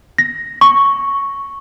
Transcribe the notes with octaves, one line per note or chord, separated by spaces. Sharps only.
A#6
C#6